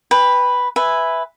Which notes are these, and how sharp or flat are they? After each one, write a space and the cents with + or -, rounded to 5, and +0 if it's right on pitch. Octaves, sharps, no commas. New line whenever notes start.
B4 +0 G5 +30
B4 +5 E5 +0 G#5 -5